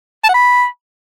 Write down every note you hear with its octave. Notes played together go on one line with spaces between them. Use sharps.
A5
F#5
B5